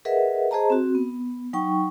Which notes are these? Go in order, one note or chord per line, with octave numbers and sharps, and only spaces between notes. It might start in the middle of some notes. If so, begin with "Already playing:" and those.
G#4 A#4 B4 D#5 E5 F#5
G#4 C5 D#5 A5 A#5
C4 F#4
B3
F#3 D#4 G5 C#6